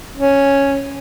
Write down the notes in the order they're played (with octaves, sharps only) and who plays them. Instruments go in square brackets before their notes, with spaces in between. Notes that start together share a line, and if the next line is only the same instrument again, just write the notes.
[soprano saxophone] C#4